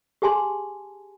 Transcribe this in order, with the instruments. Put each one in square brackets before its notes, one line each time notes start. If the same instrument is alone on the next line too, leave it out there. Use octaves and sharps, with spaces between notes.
[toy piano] G4 G#4 G#5 A5 C6